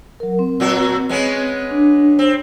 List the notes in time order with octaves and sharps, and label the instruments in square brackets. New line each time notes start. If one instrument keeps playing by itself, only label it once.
[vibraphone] F#3 A#4
C4
[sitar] A#2 F#3 F#4
G#3 B3 C#4
[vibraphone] D4
[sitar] C4